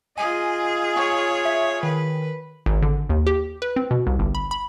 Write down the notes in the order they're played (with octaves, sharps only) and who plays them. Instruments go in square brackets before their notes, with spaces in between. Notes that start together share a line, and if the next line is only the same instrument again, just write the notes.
[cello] F4 G#4 [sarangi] D#5 [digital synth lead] G#5
[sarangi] C#5 [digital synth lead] C#6
[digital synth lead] E5
[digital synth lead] D#3 [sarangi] B4
[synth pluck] G#1
D3
D#2
G4
B4
C4
B2
C2
G1
B5
B5